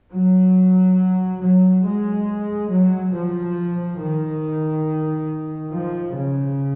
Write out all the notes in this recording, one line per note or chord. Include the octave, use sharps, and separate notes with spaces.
F#3
F#3
G#3
F#3
F3
D#3
F3
C#3